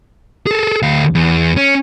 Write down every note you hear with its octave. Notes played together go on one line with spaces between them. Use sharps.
G#4 A4
D2 F5
E2
C#4